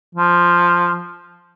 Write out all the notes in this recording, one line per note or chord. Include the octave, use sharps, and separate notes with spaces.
F3